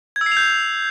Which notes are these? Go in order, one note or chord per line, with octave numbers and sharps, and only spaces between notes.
G#6
E6
C7
F7
G6